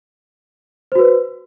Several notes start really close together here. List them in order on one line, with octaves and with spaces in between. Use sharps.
C5 F#4 B4